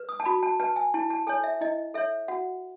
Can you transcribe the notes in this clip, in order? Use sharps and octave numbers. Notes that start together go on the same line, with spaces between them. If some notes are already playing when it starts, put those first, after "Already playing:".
Already playing: B4
D#6
A5
F#4 B5
A5
B4 A5
G#5
E4 A5
A5
A4 C#5 G#5
E5
E4 D#5
A4 C#5 E5
F#4 F#5